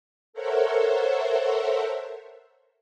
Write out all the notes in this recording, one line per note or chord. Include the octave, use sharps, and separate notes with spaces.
A4 A#4 C5 C#5 E5 F#5